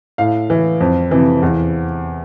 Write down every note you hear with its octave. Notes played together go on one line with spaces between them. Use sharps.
A2 F5
E3
F2
C3 E3
E2